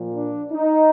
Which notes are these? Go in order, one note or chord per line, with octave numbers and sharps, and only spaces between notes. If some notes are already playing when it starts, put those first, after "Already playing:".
Already playing: A#2 F3 A#3
D4
D#4